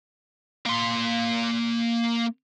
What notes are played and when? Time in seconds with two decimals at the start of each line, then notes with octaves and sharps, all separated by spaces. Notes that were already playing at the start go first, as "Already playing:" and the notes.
0.66 A#3 C6